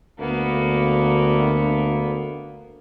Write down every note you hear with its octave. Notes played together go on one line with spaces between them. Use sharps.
D2 A#3 B3